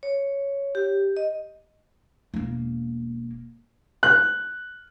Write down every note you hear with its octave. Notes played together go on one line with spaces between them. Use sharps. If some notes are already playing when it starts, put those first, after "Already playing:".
C#5
G4
D#5
E1 A#3
F#6